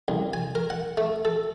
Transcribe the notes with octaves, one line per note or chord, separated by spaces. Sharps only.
C2
G#5
A#4
F#5
A3
A4